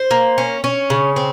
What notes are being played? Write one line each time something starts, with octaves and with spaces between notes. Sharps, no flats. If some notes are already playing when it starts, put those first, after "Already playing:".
Already playing: C5
A#3
C#4
C#4
C#3
C4